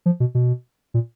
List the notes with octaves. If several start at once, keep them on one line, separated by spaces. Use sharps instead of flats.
F3
B2
B2
A#2